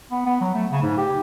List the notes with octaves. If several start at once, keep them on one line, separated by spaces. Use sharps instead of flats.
B3
B3
F#3
A3
C#3
G#2
G4